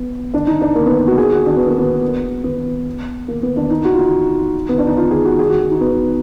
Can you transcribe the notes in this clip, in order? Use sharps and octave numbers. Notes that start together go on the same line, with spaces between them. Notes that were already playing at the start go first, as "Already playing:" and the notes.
Already playing: B3
D4
D#4
D4
A#3
B3
F#4
G#4
F#4
D4
B3
A#3
B3
B3
A#3
B3
D4
D#4
F#4
F4
D#4
B3
D4
D#4
F4
G#4
F#4
G#4
F#4
F#4
D#4
B3